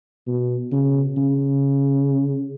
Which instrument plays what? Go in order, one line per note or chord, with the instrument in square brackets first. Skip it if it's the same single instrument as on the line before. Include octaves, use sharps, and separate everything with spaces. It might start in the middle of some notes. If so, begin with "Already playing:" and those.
[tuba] B2
C#3
C#3